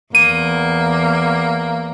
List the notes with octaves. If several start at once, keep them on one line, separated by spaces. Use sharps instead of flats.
E2 A#3 D#7